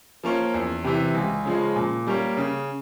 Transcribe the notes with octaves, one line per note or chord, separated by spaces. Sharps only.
F3 A#3 C#4
E2
C3 E3
C#2
C#3 F3 G#3
A#2
G3 A#3 C#4
C#3